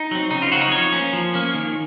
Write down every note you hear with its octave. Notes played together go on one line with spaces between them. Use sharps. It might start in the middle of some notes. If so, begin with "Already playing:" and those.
Already playing: D#4
F#3 C4
C#3 D#4
F4
F#3 C4 F#4
D#4
F3 C#5
A#3 C#4
F3
A#3 C#4
D#3